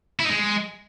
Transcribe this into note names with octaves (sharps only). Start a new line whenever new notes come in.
E4
D#4
G#3